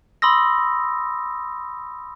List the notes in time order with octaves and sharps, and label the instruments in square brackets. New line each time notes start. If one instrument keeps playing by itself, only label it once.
[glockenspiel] B5 C6 D#6 E6 A#6